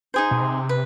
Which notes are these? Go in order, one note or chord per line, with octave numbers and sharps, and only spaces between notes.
D#4 G#4 C5
B2
C3
B4